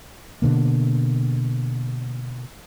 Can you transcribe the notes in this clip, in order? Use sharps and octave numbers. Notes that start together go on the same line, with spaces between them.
B2 D3 A#3